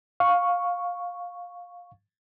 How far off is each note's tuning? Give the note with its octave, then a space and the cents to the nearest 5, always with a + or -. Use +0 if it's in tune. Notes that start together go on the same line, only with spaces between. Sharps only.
F5 +15 C#6 +0